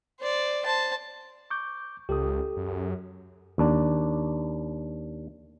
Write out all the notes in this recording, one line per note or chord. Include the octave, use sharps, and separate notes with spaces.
C5 D5
C5 A5
C#6 D6 G6
C#2 G4 A4 D#6
F#2
D#2 D4